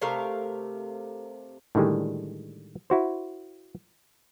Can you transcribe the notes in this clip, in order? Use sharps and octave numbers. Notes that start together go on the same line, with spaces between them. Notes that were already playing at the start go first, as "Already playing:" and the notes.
C3 A3 A#4 F5
A2 D3 D#3 G3 G#3
E4 F#4 C5